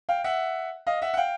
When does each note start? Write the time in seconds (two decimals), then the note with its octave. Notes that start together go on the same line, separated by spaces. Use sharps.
0.09 F5 G5
0.24 E5 F#5
0.87 D#5 F5
1.02 E5 F#5
1.14 F#5
1.17 F5 G5